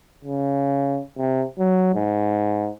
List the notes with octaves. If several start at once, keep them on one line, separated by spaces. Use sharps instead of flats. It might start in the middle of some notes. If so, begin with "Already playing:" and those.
C#3
C3
F#3
G#2